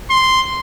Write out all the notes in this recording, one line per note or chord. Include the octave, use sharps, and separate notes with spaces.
C6